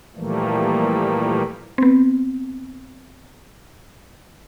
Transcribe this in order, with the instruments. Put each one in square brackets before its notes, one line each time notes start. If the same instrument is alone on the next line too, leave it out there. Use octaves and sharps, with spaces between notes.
[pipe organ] A#2 E3 F3 G3 A3 A#3
[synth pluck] B3 C4